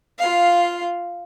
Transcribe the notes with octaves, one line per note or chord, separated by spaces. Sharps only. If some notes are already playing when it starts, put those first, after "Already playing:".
F4 F5